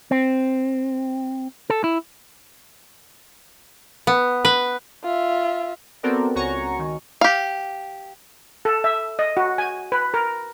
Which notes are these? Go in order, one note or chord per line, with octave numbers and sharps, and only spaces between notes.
C4
A4
E4
B3
B4
F4 E5
B3 C4 F#4 A4 A#4 D5
C#2 F#4 C#5 G#5 A#5 C#6
D#3
G4 F5
A4
E5
D#5
F#4
G#5
B4
A#4